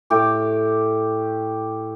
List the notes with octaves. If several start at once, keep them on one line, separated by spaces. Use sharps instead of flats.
A2 G4 D6